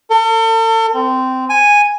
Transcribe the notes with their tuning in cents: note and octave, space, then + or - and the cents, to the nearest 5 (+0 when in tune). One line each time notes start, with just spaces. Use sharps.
A4 +40
C4 -15
G#5 -5